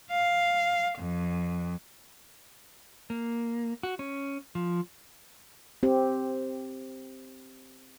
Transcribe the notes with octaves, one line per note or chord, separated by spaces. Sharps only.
F5
F2
A#3
F#4
C#4
F3
C4 G4